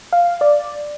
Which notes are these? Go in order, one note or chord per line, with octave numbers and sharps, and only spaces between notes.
F5
D5